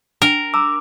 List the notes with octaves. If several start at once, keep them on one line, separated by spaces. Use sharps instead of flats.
D4 A#4 G5
A#5 D6 E6